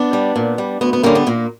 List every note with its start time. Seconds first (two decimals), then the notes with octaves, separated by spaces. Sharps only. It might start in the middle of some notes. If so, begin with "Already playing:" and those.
Already playing: B3 D4
0.13 G3
0.36 A#2
0.58 G3
0.81 D2 B3
0.93 B3
1.03 D3 G3 A#3 C#4
1.15 B3
1.27 A#2 A#3